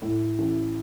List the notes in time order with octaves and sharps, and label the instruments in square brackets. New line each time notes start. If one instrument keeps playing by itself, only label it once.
[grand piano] A2
A1